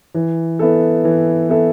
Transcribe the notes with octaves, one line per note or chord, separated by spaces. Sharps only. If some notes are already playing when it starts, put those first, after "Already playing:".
E3
B3 E4 A4
E3
B3 E4 A4